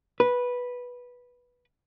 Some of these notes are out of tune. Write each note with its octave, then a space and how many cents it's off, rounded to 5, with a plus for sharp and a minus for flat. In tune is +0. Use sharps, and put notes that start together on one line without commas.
B4 -10